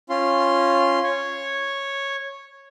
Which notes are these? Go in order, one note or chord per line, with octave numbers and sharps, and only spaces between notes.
C#4 F4 C6
C#5